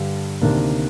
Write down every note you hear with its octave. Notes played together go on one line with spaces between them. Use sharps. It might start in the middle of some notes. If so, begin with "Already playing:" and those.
Already playing: G2 D3 G3
D2 C3 D#3 A#3 D4